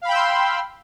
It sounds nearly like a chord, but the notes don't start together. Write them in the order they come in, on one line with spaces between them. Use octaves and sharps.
F5 B5 G5 E6 C6